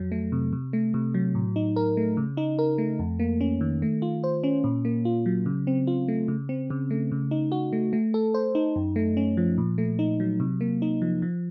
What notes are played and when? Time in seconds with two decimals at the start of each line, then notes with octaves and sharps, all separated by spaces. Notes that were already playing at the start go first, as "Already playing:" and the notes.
Already playing: F2 F#3
0.12 A3
0.32 C3
0.53 C3
0.73 A3
0.94 C3
1.14 F#3
1.35 A2
1.56 D#4
1.76 A#4
1.97 A3
2.17 C#3
2.37 D#4
2.59 A#4
2.78 A3
2.99 F2
3.19 A#3
3.41 C#4
3.61 D#3
3.82 A3
4.02 F4
4.24 C5
4.44 C#4
4.64 A#2
4.85 A#3
5.05 F4
5.26 F#3
5.46 C#3
5.67 C4
5.87 F4
6.08 A3
6.28 C#3
6.49 C4
6.70 C#3
6.91 A3
7.12 C#3
7.31 D#4
7.52 F#4
7.73 A3
7.93 A3
8.14 A4
8.34 C5
8.55 D#4
8.76 F#2
8.96 A3
9.17 C#4
9.37 F3
9.58 A#2
9.78 A3
9.99 D#4
10.20 F#3
10.40 C3
10.61 A#3
10.82 D#4
11.02 F3
11.22 F3